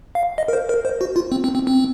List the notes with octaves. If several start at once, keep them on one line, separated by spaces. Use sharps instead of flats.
F5
D#5
A#4
C5
A#4
C5
F#4
F4
C4
C4
C4
C4